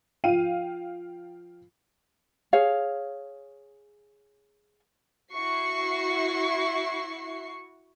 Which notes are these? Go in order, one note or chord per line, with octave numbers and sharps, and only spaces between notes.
F3 F5 G5 D#7
G#4 C#5 F5
E4 F#4 C#6 C7